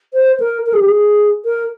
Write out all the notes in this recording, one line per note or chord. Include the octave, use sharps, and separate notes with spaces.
C5
A#4
A#4
G#4
G4
G#4
A#4